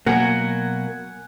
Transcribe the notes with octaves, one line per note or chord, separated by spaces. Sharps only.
B2 F#3 A#3 F#5 G#5